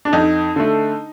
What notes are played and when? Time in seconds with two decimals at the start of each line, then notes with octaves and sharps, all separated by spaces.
0.05 D4
0.13 F2 D#4
0.56 D3 A3